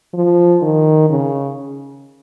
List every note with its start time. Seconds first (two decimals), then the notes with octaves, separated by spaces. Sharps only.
0.14 F3
0.62 D#3
1.10 C#3